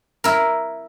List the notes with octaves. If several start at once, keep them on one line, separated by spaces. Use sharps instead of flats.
E4 A#4